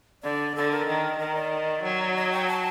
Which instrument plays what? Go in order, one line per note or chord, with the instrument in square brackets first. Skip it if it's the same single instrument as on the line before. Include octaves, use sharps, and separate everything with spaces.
[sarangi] D3 [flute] D5
[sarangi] D3 [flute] A4
[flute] A#4
[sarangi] D#3
[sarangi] D#3 [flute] A#4
[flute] D5
[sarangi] F#3
[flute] D#5
G5
A5